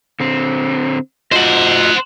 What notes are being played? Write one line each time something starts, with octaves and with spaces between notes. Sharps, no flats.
D3 C4
F4 F#4 C5 D#5 F#5